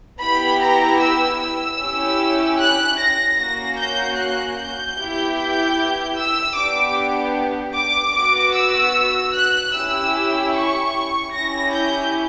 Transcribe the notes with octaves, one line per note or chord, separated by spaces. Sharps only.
B3 E4 G4 B5
A#5
E6
E6
C#4 E4 G4
F#6
A#6
A#3 C#4 F#4 A#6
G6
F#6
G6
B3 E4 G4
G6
E6
B3 D4 G4 D6
D6
B3 F#4 D6
E6
F#6
C#4 E4 G4 E6
C#6
C#4 E4 G4 A#6
G6